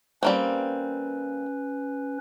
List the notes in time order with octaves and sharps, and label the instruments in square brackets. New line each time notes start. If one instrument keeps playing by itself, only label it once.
[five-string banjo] G3 A#3 C4 [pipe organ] C#4 B4